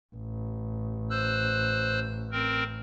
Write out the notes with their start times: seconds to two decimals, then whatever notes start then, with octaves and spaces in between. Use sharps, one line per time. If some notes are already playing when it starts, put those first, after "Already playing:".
0.15 A1
1.10 C5 E6 F#6
2.32 C4 A#4